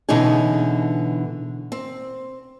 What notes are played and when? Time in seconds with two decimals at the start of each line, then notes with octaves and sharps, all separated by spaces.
0.09 B2 D3 E3 C#4 D#4 G#4
1.72 C4